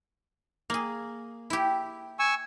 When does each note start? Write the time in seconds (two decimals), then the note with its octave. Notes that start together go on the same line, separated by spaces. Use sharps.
0.70 A#3 G#4
1.50 E4 G4
2.19 G#5 C#6 E6